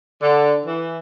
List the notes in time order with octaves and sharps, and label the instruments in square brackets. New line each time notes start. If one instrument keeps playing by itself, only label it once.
[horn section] D3
E3